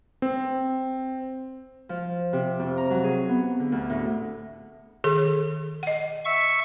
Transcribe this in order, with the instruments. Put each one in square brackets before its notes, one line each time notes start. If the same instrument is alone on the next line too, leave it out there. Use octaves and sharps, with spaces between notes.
[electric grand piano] C4
[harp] F3
C3
F2
A#5
F#3
G#4
B3
D3
D2
A2
[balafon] D#3 G#4 A4
D#5 F#5
[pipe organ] E5 C#6